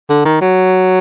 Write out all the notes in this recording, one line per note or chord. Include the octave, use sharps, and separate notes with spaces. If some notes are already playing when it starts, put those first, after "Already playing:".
D3
D#3
F#3